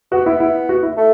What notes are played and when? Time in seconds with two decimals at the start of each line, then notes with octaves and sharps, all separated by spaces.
0.12 B3 F#4
0.26 B3 E4
0.40 E4
0.69 F#4
0.83 E4
0.97 A3